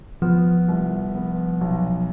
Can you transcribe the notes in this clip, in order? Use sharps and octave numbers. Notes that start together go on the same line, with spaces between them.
F3 B3
C2
B3
B1